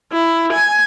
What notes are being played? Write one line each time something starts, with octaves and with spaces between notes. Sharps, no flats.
E4
G#5